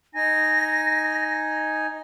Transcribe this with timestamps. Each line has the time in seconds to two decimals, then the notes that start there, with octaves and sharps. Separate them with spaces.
0.15 D#4 G#5 A#6